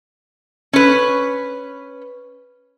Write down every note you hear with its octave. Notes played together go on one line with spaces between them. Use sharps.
C#4 B4